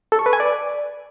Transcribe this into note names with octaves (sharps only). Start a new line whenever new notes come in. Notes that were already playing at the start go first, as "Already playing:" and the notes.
A4
C#6
B4
G#5
D5